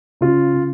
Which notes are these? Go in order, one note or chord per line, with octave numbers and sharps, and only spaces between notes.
C#3 F4
C#3